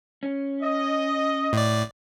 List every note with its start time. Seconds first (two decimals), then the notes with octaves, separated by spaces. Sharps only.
0.23 C#4
0.63 D#5
1.53 A2 D5